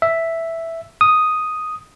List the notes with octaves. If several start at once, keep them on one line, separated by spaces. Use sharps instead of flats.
E5
D#6